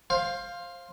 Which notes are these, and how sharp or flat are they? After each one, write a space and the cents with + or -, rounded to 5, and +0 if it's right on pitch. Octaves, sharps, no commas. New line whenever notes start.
C5 +15 F5 +0